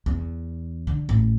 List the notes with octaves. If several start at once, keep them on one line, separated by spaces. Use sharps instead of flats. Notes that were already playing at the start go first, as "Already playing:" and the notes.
E2
D3
A1